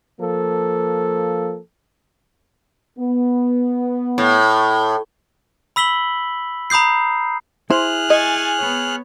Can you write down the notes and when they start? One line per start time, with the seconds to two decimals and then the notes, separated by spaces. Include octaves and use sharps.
0.21 F3 A#3 A4
2.98 B3
4.18 A2
5.76 B5 E6 B6 F#7 G7
6.70 A#5 B5 D#6 G6 C7
7.70 E4 G#4 C5 F6 F#6
8.10 D#5 G#5 C#6 A6
8.60 B3 C#5